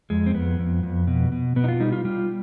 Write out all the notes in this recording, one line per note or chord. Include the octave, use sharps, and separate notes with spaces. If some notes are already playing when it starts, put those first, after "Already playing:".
F2 G#3
C4
F2 B3
F2
F2
B2
B2
B2 B3
D#4
F4
G3 D#4
F4
G3 F4